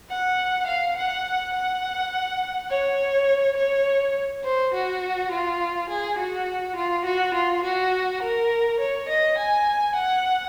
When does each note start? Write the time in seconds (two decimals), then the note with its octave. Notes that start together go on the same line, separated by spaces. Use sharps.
0.10 F#5
0.67 F5
0.97 F#5
1.54 F#5
2.70 C#5
3.57 C#5
4.44 C5
4.74 F#4
5.32 F4
5.89 G#4
6.18 F#4
6.76 F4
7.05 F#4
7.34 F4
7.63 F#4
8.22 A#4
8.80 C#5
9.09 D#5
9.38 G#5
9.95 F#5